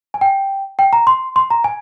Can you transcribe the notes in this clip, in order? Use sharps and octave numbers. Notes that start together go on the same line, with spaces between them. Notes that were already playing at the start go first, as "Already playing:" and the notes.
G#5
G5
G5
A#5
C6
C6
A#5
G#5